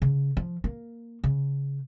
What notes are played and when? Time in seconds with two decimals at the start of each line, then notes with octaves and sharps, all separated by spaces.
0.02 C#3
0.37 F3
0.64 A#3
1.24 C#3